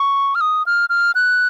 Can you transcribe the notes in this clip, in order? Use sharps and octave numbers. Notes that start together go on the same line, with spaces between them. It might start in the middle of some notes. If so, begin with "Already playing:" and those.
Already playing: C#6
F6
D#6
F6
F6
F#6